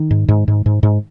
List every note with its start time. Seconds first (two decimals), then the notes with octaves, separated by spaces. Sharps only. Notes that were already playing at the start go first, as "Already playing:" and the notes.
Already playing: D#3
0.11 G#2
0.28 G#2
0.48 G#2
0.66 G#2
0.83 G#2